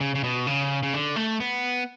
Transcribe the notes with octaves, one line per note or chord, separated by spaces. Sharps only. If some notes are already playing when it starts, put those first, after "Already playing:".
C#3
C#3
B2
C#3
C#3
D3
A3
B3